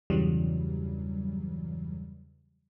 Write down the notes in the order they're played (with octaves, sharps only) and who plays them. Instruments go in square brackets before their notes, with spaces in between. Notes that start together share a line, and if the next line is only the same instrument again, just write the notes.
[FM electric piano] E2 G2 C#3 E3 F#3 G3